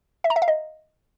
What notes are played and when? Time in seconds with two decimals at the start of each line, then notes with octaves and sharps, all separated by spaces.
0.24 E5
0.30 A#5
0.36 E5
0.42 F5
0.48 D#5